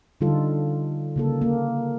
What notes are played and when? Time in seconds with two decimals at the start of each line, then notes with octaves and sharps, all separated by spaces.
0.21 D3 G3 D#4 F4 A4
1.16 C#3 A#3 A4
1.42 A#3